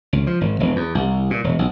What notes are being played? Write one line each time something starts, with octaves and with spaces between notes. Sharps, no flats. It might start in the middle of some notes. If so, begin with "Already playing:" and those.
C#2
F3
G#1
E1
E2
C2
A#2
E1
B1